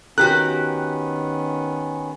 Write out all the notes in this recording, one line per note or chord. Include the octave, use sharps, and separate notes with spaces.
D#3 B3 C#4 F#4 G4 A#4 F#6